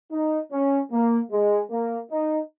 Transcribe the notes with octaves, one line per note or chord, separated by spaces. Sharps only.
D#4
C#4
A#3
G#3
A#3
D#4